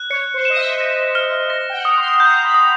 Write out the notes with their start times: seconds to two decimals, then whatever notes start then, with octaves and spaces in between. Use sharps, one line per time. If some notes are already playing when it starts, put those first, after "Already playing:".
Already playing: F#6
0.10 C#5 C#7
0.34 C5
0.45 D#5 E7
0.57 E5
0.80 A#6
1.15 F6
1.50 A#6
1.70 G5
1.74 F#5
1.85 D#6
1.97 C6
2.20 A#5 G6
2.44 B5
2.54 D#6